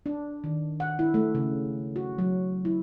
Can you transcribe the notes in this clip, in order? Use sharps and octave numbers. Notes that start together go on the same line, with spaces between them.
D4
D#3
F#5
E4
A3
C#3
F#4
F#3
E4